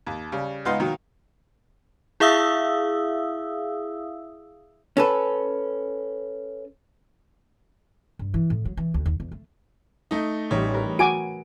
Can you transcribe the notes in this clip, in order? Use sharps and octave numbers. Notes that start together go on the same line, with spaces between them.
D#2
C#3 G3
C#2 B3 D#4 F5 C6
B2 D#3 F#3 A#3
E4 G#4 E5 F5 D#6 E6
C#4 A4 B4
G2
E3
A2
F#3
E3
D2
D#2
E2
A3
A3 D#4
A1 G3 D#4 C#5
A#4 B4
F#4 G#5 D6 D7